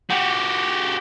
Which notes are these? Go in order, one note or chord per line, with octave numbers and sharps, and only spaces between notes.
F#4 G4